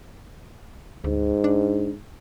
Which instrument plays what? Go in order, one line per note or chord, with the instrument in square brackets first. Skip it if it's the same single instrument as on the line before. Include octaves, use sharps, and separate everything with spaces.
[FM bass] D2 [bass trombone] G#2
[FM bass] D4